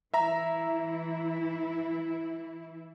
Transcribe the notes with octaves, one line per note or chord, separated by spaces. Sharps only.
E3 E4 E5 A#5